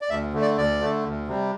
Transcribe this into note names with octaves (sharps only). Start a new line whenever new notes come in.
D5
D2 E5
D3 A3
D5
D2 D5
D3 A3
D2
C3 G3